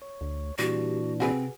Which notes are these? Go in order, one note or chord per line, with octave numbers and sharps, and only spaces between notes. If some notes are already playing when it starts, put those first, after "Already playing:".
C#5
D2
A#2 E3 G3 D4 F#4
C3 C4 F#4 G#4 B4